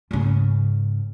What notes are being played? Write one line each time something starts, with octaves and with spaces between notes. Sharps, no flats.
G#2 C#3